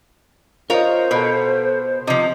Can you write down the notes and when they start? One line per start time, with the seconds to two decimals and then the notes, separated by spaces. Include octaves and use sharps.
0.70 F4 A#4 C5 C#5 D#5 F5
1.11 B2 A4 B4
2.07 C3 F3 D#5